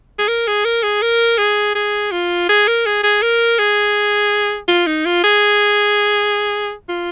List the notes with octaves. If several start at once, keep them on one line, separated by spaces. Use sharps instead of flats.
G#4
A#4
G#4
A#4
G#4
A#4
G#4
G#4
F4
G#4
A#4
G#4
G#4
A#4
G#4
F4
D#4
F4
G#4
F4